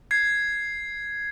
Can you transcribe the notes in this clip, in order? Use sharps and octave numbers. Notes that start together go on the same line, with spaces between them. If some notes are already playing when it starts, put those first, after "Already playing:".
G#6 C7